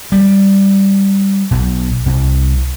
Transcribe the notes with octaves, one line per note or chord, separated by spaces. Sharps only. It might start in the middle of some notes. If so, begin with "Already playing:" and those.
G3
B1
C2